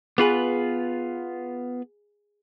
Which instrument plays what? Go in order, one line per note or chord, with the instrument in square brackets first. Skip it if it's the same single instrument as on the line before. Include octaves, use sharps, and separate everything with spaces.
[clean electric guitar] B3 F4 B4 [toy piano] G#4 G#5